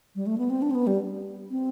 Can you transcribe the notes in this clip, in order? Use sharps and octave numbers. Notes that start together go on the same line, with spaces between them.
G3
A3
B3
C4
D4
C4
B3
G3
C4